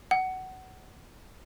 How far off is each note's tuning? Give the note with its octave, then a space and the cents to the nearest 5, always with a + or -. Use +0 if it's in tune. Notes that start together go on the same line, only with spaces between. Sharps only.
F#5 +20